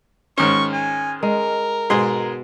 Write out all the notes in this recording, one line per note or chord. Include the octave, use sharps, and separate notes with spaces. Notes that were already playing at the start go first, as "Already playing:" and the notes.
G#2 D#3 C#4 C#6
G#5
G#3 A#4
G#2 B2 G#4 C6